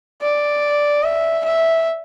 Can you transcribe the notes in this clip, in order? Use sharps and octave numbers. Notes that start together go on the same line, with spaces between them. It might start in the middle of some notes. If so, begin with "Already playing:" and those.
D5
E5
E5